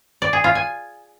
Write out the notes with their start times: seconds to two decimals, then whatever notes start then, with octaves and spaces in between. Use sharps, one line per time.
0.22 D5
0.33 G#4
0.44 F4
0.55 G#5